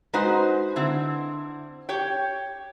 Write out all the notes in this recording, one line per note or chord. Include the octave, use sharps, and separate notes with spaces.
G#3 D#4 F#4 B4 C5
D3 C4 E4
G4 C#5 G5